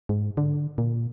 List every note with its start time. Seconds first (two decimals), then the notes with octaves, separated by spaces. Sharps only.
0.09 G#2
0.37 D3
0.78 A#2